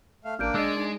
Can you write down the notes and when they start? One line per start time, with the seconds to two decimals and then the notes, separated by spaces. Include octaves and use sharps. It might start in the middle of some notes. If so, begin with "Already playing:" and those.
0.25 A3 F5
0.39 A1 A#3 D4 F6 G6 D7
0.55 G#3 D4 D5 D#5 E6
0.77 D#4